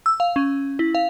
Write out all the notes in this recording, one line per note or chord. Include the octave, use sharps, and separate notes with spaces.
E6
F5
C#4
E4
F5